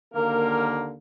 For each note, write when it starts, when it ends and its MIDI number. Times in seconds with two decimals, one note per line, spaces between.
0.14 0.96 39
0.14 0.96 50
0.14 0.96 58
0.14 0.70 70